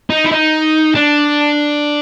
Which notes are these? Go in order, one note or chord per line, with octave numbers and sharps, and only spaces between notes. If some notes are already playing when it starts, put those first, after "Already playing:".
D#4
E4
D#4
D4